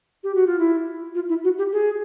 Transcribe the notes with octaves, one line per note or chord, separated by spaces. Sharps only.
G4
F#4
F4
E4
F4
E4
F#4
G4
G#4